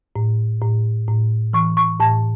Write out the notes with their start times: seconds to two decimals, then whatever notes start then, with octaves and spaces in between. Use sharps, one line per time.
0.16 A2
0.61 A2
1.08 A2
1.53 E3 C#6
1.77 C#6
2.00 A2 A5